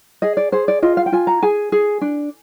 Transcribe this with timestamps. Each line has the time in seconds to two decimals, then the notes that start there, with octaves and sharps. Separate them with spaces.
0.22 G#4 D#5
0.37 D5
0.52 G#4 C5
0.68 D5
0.82 F4 D#5
0.97 F5
1.06 G5
1.12 F4 G#5
1.27 A#5
1.42 G#4 G#5
1.72 G#4
2.01 D4